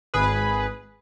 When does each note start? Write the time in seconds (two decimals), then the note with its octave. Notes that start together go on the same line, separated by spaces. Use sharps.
0.14 G#1 G#4 B4